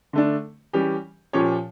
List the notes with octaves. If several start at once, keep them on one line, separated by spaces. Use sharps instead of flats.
D3 A3 D4
E3 G3 C#4 G4
A#2 F3 C#4 G4 C#5